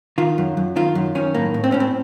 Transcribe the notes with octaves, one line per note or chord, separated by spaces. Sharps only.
D#3 F4
F#2
F#2
D#3 F4
F#2
D#3 C#4
A2 A#3
A2
C4
A2 C#4
C4